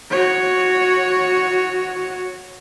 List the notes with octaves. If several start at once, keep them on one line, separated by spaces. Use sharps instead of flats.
F#4 C#5